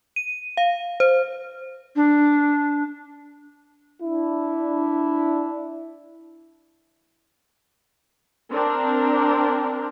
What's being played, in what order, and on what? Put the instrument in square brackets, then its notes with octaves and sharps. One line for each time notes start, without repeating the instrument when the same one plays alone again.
[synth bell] D#7
F5
C5
[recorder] D4
[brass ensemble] D4 E4
[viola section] C4 D4 A#4